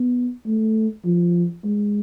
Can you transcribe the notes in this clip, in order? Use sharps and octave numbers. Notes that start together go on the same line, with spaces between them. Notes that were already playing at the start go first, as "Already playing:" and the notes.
Already playing: B3
A3
F3
G#3